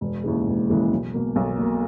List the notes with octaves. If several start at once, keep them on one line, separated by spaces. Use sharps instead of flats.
E1
D#2 C#3 E3 G#3
E1
D#2 C#3 E3 G#3
B1
B2 A#3
B1
B2 A#3